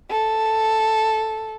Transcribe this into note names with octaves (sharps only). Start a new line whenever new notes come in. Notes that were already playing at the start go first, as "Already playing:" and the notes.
A4